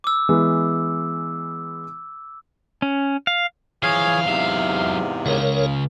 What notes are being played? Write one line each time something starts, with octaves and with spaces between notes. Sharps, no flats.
D6 E6
E3 G#3 B3
C#4
F5
E3 F3 G#4 C#5 F5
E2 G#2 C3 F#3 E5
C#2 C#3 A#4 C#5